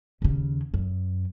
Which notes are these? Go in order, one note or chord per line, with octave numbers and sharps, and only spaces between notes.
D#2 C#3
F#2